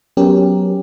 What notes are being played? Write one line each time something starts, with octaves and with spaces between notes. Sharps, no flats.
F#3 B3 C#4 G4 A#4